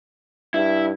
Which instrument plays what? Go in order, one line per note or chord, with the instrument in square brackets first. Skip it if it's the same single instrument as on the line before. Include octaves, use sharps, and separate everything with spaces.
[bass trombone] G2 [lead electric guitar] E4